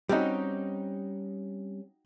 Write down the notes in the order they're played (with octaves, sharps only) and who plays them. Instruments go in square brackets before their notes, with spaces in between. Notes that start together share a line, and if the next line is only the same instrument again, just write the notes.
[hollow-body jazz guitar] G3 C4 C#4 [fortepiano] D#4 F#4 G4